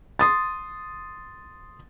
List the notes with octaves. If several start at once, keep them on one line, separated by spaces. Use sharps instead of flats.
C6 D#6 A6